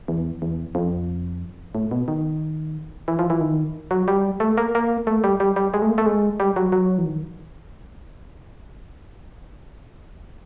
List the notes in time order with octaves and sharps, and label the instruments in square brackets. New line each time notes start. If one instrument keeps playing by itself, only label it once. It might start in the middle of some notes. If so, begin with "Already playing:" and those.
[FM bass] E2
E2
F2
A2
B2
D#3
E3
F3
E3
D#3
F#3
G3
A3
A#3
A#3
A3
G3
G3
G3
G#3
A3
A#3
A3
G#3
G3
F#3
F#3
E3
D#3